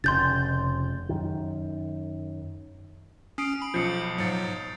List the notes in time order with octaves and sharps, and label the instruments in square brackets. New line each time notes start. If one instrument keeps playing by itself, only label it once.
[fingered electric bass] F1 A#1 C#3 [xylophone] C6 G6 A6
[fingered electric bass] F#2 D#3
[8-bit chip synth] C#4 [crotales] D#6 C7 D7
[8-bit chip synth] B5
[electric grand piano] B1 F3 [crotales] G6 C7 C#7
[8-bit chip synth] G#2 F#3 [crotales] A6 C#7